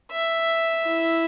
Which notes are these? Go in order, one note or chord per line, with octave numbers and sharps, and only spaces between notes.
E5
E4